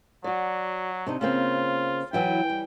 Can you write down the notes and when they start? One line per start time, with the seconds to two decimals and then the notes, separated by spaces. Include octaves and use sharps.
0.24 F#3 F#4 D5
1.07 C3 D4 D#4
1.21 C#3 A#3 C4 F4
2.13 E3 F#3 E4 G5
2.49 G3